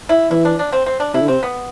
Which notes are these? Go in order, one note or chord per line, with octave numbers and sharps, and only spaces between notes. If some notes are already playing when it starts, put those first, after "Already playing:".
E4
E3 E4
D4
D4
C4
C4
D4
C3 E4
D3
C3 C4
B3